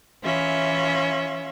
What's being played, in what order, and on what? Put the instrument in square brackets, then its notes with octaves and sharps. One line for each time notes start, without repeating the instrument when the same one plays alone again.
[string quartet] E3 C#4 F4 E5